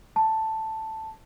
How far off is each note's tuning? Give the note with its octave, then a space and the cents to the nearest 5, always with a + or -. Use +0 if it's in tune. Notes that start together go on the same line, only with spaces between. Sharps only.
A5 +5